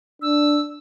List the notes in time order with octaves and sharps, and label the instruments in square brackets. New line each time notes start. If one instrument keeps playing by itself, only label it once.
[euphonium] D4 [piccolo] E6